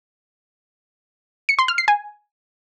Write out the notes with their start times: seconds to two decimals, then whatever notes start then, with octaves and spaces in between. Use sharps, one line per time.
1.49 C#7
1.59 C6
1.68 F6
1.78 C7
1.88 G#5